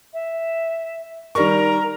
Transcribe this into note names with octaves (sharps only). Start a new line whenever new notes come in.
E5
D#3 G3 A#4 A#5 C#6